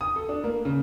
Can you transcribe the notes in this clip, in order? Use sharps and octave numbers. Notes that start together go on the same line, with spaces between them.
D#6
A4
D4
A#3
C#3